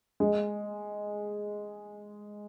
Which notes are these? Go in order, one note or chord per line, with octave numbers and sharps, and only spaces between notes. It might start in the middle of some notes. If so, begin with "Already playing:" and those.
G#3